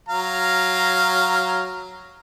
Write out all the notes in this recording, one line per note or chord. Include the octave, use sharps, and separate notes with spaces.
F#3 F5 A#5